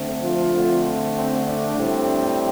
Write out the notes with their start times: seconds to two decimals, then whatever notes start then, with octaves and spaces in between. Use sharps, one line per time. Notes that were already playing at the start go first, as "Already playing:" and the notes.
Already playing: D3 A3 C4
0.21 F3 F4
0.52 D3 A3 C4
1.14 C4
1.44 D4
1.75 A2 G3 C4